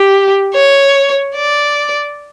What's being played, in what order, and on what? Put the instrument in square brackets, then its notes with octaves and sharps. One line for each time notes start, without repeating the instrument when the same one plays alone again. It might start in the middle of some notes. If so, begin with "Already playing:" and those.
Already playing: [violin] G4
C#5
D5